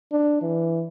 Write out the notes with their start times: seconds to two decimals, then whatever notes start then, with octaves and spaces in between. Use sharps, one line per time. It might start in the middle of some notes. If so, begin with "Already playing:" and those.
0.12 D4
0.42 E3